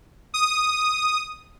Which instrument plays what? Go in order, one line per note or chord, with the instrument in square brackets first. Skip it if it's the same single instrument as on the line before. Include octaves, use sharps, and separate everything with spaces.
[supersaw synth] D#6